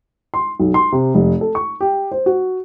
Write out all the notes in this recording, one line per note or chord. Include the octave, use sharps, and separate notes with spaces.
C6
B1
C6
C3
F1
A4
C#6
G4
C5
F#4